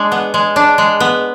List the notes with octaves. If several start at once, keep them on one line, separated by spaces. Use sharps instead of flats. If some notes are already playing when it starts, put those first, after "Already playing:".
Already playing: G#3 D4
B3
G#3
D4
G#3
B3